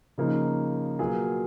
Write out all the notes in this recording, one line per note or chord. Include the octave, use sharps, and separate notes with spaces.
C#3 F3 A#3 D#4
B2 F#3 A#3 F4 G#4